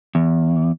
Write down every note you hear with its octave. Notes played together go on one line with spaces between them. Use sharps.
E2